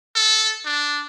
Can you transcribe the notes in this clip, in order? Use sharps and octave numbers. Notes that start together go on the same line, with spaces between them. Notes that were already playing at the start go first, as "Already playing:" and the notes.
A4
D4